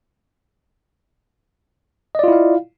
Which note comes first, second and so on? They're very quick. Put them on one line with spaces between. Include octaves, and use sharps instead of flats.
D#5 D5 F4 E4 F5